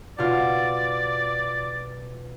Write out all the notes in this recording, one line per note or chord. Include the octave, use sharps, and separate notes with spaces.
B2 F4 D5